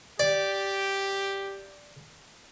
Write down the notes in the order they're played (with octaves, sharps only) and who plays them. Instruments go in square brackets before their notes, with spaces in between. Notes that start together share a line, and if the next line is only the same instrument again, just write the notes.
[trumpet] G4 [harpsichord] D5